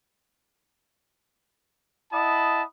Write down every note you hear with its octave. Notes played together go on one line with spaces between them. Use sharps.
E4 D#5 F#5 A5 B5 D#6